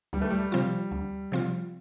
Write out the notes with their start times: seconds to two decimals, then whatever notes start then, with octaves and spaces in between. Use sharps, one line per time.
0.13 D2 G3
0.22 A3
0.30 G3
0.52 C3 F3 C4 F4
0.91 D2
1.32 C3 F3 C4 F4